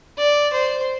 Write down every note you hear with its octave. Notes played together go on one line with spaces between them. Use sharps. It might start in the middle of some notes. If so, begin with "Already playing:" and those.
D5
C5